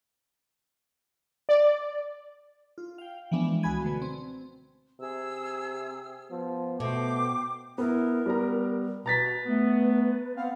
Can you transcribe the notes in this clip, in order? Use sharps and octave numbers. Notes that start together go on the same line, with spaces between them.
D5
F4
F5 G5
E3 F3 G#3 B3 D4
C#2 F#4 G#5 B5 G#6 D#7
B2 D3 A3
C4
C3 G#4 E6
F3 B3
B2 A3 C5 G5 D6
B3 E4 A#4
G3 B3 A#5
B2 B4 A#5 A6 B6
A3 B3
B3 C4 F5 F#5